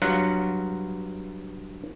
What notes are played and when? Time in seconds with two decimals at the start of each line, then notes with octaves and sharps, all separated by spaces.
0.02 G2 F#3 F4 F#5